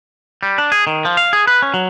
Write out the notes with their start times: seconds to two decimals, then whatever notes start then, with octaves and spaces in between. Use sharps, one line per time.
0.43 G3
0.58 D4
0.72 G#4
0.87 D#3
1.05 F3
1.17 F5
1.33 G#4
1.47 B4
1.62 C#4
1.74 F#3